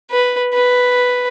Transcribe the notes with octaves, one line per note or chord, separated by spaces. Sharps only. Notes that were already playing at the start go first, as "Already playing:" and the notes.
B4
B4